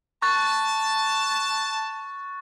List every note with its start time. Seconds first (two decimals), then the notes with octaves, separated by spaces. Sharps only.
0.22 A5 C#6 F#6 A6